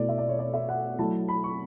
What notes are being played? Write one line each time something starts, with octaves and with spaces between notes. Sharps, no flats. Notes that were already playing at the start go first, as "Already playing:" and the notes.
Already playing: B2 A3 E4 D5
E5
D5
C#5
D5
E5
F#5
F#3 A3 E4 A5
B5
C#6